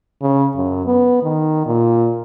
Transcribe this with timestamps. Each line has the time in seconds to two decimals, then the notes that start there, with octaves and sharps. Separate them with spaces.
0.22 C#3
0.56 F#2
0.86 B3
1.23 D#3
1.66 A#2